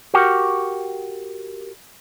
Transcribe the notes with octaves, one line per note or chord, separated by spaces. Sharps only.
F#4 G4 A#4 F#5 G5